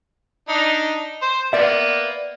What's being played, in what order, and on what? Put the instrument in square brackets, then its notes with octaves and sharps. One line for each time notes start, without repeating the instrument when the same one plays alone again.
[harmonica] D4 D#4
C5
[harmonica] A#3 B3 [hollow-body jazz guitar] D5 E5